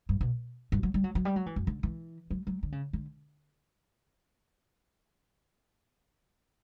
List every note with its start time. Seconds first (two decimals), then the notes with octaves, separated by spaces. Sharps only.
0.09 G2
0.21 B2
0.72 G2
0.83 F#3
0.94 G3
1.04 F#3
1.15 F#3
1.25 G3
1.36 F#3
1.46 E3
1.56 F#2
1.67 D3
1.83 E3
2.31 F#3
2.47 F#3
2.63 D3
2.72 C#3
2.93 D3